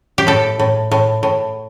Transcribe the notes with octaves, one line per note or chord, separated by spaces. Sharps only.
G4
A2 A4
A2
A2
A2